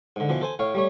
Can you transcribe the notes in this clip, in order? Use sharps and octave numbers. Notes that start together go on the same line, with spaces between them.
G#2 D3
B2 E3 F3
A4 C5 G#5
A2 C#5 F5
G3 A3 C#5